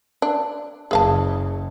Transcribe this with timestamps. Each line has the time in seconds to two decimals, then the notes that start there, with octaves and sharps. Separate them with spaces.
0.22 D4
0.91 F#1 C#3 G#4 F5 A5